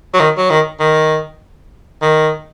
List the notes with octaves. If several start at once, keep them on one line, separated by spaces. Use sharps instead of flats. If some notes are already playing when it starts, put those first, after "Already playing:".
F#3
D#3
F#3
D#3
D#3
D#3